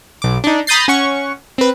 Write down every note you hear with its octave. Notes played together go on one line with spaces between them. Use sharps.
B1 D6
D4 D#4
A#5 B5 D#6 G6 A6 C7
C#4 F#5 C#6
C4 B4